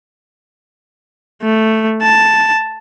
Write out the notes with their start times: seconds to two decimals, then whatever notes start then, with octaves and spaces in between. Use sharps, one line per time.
1.43 A3
2.02 A5